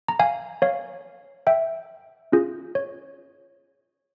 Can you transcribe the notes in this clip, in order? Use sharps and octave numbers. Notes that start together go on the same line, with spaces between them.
A#5
F5 G#5
C#5 F5
E5 G5
C#4 F4 G#4
C#5